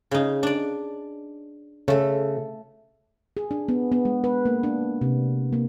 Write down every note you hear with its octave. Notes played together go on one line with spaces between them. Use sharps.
C#3 D#4
D4 D5
C#3 A3 A4
G#4
D4
B3
B3
G#3
B4
A#3
D4
C3
A#3